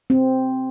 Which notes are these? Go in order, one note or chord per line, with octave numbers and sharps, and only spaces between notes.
C4